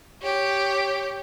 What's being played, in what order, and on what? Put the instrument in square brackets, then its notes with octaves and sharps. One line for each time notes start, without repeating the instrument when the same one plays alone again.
[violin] G4 C#5